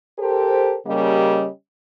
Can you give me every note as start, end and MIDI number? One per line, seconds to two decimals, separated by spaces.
0.19 0.76 67
0.19 0.76 69
0.19 0.76 70
0.19 0.76 72
0.86 1.47 49
0.86 1.47 55
0.86 1.47 58
0.86 1.47 61
0.86 1.47 67
0.86 1.47 75